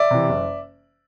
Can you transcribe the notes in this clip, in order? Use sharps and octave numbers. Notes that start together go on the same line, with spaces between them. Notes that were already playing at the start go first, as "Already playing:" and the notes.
Already playing: D5 E5
C3 E3
F#1